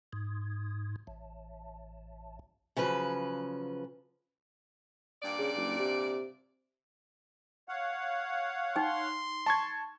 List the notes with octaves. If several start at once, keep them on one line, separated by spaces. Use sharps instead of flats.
G#2
A1
C#3 F3 F#3 B4
G2 A#2 D5
C#3
F#1
C3
C#5 F5 F#5
D#4 G5 C6
A5 C#6 G#6